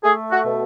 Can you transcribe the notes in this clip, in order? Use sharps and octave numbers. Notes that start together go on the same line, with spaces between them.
A3 G#4
F#4
B2